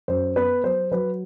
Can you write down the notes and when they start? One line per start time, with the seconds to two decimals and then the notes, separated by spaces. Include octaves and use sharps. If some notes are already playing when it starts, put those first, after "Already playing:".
0.08 F#2 C5
0.36 B3 B4
0.64 F#3 C5
0.91 F#3 B4